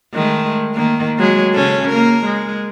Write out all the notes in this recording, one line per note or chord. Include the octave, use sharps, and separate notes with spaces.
D#3 G#3 A3
D#3 A#3
F#3 G#3
C#3 C#4 A4
A#3 A#4
G#3